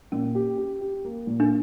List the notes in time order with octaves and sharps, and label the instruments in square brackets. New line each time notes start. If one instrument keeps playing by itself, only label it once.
[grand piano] A#2 [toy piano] C#4
[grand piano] G4
G4
G4
A#3
A#2
[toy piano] D4